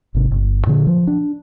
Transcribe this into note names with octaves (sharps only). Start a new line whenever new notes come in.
G#1 C3
G1
A#2 D3
F3
D4